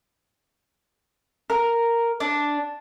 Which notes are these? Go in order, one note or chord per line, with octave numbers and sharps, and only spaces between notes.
A#4
D4